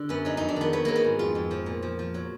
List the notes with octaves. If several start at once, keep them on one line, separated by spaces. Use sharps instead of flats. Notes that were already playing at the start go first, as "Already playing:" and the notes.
Already playing: D3
F#2 B3
F#3 D#4
F2 D#4
D4
D#3 B3
F#3 B3
F#3 A#3
B3
G#2
F2 F4
F2
F3
A#2
F3
F3
F#3